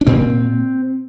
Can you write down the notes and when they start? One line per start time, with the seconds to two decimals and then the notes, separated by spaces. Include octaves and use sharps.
0.01 D4
0.07 A#2 C4